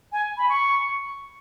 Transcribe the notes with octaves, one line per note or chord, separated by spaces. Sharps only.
G#5
B5
C#6